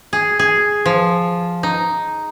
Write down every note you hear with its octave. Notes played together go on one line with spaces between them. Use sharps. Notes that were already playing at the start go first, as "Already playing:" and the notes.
G#4
G#4
F3
D#4